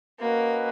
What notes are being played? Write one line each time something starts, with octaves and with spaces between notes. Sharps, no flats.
A#3 C#4 F#4 B4 D#5